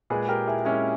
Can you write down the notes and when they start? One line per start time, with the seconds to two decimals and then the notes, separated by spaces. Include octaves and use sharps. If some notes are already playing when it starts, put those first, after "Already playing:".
0.10 A#2 G#3 G#4 B4
0.29 G4 A#4
0.47 E4 G#4
0.65 A#2 G#3 C#4 E4